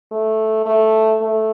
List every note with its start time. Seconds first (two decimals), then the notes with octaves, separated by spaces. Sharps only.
0.11 A3
0.66 A3
1.21 A3